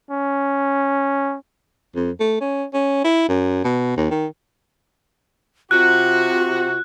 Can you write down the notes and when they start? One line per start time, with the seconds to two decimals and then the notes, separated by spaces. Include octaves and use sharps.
0.11 C#4
1.95 F2
2.20 A3
2.41 C#4
2.74 C#4
3.04 E4
3.28 F#2
3.64 B2
3.97 D#2
4.11 D#3
5.71 C3 F4 F#4 F#6